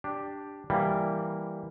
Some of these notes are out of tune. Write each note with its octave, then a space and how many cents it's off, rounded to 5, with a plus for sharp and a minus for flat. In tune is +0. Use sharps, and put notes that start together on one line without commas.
D4 +0 G4 +0
E3 -5 G3 +0 A#3 -10